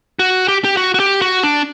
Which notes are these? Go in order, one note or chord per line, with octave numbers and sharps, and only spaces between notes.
F#4
G4
G4
F#4
F#4
G4
F#4
D4